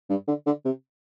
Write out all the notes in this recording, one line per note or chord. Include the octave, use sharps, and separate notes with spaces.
G2
D3
D3
C3